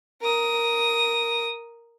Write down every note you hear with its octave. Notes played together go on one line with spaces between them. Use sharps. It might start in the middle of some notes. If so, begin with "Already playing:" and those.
A#4 D#6